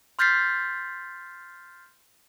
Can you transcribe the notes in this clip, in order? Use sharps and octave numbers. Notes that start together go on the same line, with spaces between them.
C6 F6 G6 A6 B6 C7